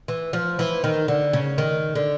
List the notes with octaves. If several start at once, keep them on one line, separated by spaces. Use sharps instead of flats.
E3
F3
E3
D#3
D3
C#3
D#3
D3